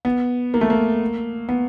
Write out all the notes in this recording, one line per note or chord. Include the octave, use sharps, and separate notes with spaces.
B3
A#3
A3
A#3
B3